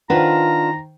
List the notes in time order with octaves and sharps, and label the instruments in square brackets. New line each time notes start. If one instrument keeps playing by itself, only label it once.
[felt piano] D#3 C5 [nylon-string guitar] D4 B4 F#5 [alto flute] F4 [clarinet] A#5